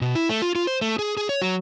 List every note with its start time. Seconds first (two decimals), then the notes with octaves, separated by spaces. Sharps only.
0.01 B2
0.15 E4
0.29 A3
0.42 F4
0.55 F4
0.67 C5
0.82 A3
0.99 G#4
1.17 G#4
1.29 C#5
1.42 F#3